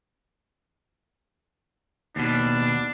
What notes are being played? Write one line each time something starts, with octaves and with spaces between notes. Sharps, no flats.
D#2 B2 D4